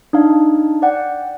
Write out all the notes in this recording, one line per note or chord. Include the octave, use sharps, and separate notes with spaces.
D4 D#4 F5
D5 F#5 G5